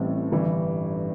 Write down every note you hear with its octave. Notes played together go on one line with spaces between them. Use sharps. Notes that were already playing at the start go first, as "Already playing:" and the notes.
Already playing: A1 A2 E3 G3 C4
G1 G2 E3 G3